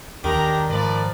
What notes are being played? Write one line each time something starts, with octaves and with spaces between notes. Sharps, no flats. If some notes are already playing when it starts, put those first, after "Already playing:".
D#2 D#3 D4 G4 A#5
G#2 F3 A#4 B4 D5